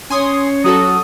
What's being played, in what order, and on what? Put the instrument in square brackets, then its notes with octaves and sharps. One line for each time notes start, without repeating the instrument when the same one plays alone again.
[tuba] C#4 [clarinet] C#5 [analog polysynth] G#5 C6 D#6
[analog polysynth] F#3 F#4 A4 [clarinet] D#6